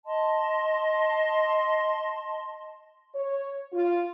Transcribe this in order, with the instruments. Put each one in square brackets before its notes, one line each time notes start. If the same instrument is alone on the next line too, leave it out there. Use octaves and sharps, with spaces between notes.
[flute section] D#5 A5 C6
[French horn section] C#5
F4